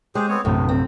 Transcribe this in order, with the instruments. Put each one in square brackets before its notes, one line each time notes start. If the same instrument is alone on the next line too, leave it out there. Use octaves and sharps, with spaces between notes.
[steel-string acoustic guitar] G#3 [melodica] G4 G#4 C5
[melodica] B3 C4 C#5
[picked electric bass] A#1 F#2 C3 [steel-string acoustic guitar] A2 [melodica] B3
[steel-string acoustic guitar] C4